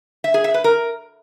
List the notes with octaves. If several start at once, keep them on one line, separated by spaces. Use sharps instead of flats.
E5
G#4
E5
B4
A#4